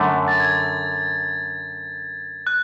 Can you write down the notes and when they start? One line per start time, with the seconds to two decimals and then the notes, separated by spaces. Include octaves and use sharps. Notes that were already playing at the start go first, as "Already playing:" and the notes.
Already playing: F#2 D3 A3
0.28 A6
0.40 G#6
0.52 A6
2.47 F#6